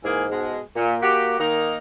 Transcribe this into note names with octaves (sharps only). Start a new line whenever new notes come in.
G#2 E3 A#3 G#4
B2 G#3
A#2 A#3
F#4 G4
D#3 A#3 D#4